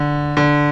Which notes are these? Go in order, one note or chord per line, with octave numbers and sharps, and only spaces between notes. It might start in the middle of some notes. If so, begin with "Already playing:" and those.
Already playing: D3
D3